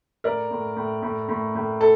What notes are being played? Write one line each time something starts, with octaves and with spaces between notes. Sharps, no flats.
A2 A#4 D5
A2
A2
A2
A2
A2
A4